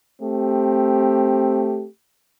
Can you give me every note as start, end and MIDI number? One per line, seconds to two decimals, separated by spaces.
0.21 1.86 57
0.21 1.86 60
0.21 1.86 67